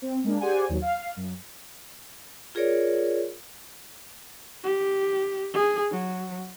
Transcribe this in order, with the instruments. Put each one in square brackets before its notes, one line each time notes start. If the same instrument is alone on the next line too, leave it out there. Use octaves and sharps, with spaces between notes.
[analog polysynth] C4
G#3 A#3 D4
G4 G#4 C5 D5 F#5 G#5
D#2 F#3
F5
F#2
[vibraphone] F4 G#4 A#4 C#5 D5
[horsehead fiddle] G4
G#4
F#3